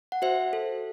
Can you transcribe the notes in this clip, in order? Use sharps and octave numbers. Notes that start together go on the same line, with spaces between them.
F#5
F#4 C5 E5
A4